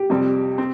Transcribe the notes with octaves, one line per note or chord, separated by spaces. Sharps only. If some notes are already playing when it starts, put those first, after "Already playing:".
Already playing: G4
F2 C3 G3 C4
C4